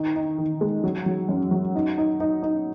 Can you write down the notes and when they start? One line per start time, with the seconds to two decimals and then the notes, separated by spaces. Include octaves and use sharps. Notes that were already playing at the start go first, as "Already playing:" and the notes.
Already playing: D#3 D#4
0.15 D#4
0.38 D#3
0.61 G#3
0.84 F#3
1.06 F#3
1.29 F#2
1.51 F#3
1.75 D#4
1.98 D#4
2.20 D#4
2.43 D#4